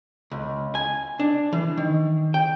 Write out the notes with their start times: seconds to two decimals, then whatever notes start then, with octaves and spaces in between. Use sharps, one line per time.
0.31 C#2
0.75 G#5
1.20 D4
1.53 E3
1.77 D#3
2.34 G5